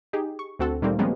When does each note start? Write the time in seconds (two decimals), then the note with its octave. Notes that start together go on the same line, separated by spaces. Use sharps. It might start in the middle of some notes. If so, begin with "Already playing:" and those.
0.13 D#4 G4 G#4
0.39 C#6
0.59 D2 C4 F#4 A4 F#5
0.82 A#2 D#3 G3 A3 A#3 C4
0.99 F3 G3 G#3 A#3 B3 C#4